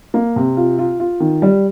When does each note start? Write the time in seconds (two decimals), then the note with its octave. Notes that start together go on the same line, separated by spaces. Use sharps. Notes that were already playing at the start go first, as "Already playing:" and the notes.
0.14 A#3
0.36 C3
0.57 F4
0.79 F4
1.00 F4
1.20 D#3
1.42 G3